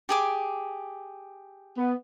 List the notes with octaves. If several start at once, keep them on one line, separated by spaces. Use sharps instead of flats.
G4 G#4 D6
B3